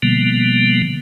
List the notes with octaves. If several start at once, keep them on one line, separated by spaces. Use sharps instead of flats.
B2 D3 F3 G3 A#3 B3